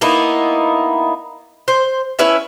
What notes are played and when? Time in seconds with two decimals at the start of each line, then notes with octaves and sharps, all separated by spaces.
0.01 A#3 B3 D#4 E4
1.68 C5
2.19 C#4 E4 B4 E5